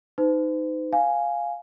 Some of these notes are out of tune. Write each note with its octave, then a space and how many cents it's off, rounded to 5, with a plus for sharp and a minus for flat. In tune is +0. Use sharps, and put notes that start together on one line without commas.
D#4 +0 C5 -45
F5 +0 G#5 +0